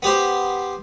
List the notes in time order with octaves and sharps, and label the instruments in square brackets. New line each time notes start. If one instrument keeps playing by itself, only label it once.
[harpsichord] B3 G4 C5